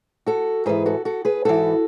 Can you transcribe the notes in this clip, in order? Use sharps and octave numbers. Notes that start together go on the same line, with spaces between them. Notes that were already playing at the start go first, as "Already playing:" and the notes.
F#4 A4
G#2 E3 G#4 B4
F#4 A4
F#4 A4
G#4 B4
G#2 E3 F#4 A4